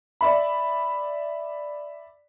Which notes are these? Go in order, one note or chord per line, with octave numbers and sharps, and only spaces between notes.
D5 E5 B5